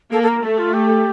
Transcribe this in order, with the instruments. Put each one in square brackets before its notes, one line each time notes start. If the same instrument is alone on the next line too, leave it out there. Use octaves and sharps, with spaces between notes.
[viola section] A#3 [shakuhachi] A4
[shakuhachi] A4
A#4
[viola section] A3 [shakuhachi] A4
[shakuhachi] F4
G4